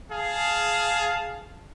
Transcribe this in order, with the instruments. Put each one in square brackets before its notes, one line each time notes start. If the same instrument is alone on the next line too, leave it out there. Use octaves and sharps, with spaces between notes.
[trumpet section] G#4 F5 A5